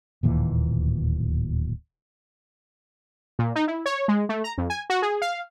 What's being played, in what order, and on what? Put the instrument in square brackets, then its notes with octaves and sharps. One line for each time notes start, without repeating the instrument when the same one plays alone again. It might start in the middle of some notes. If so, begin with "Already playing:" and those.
[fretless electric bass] D1 D#2 A#2 E3
[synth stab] A#2
D#4
E4
C#5
G#3
A3
A#5
F2
G#5
F#4
G#4
F5